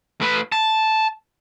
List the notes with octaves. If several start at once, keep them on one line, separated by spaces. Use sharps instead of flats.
A2 B4
A5